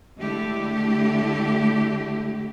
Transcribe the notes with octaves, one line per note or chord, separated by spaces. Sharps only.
D3 G#3 A3 E4 G4